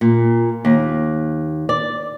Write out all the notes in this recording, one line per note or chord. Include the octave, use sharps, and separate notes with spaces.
A#2
D#2
D5